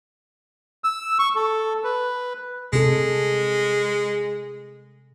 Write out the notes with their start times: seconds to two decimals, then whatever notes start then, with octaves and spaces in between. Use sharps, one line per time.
0.84 E6
1.19 C#6
1.36 A4
1.84 B4
2.73 C3 G#3 A4